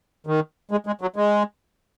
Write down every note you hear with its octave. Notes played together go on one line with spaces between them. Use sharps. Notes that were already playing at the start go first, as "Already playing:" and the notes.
D#3
G#3
G#3
F#3
G#3